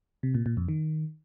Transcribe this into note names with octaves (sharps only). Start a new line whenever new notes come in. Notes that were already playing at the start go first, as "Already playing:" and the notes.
C3
A#2
A#2
F2
D#3